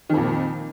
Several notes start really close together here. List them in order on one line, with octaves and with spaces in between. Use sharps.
D#3 F2 A#2